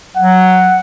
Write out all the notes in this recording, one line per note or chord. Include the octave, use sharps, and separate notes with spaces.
F#3 F#5